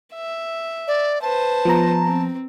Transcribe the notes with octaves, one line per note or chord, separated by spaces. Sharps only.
E5
D5
B4 C5 A5
F3 B3 A#5
C4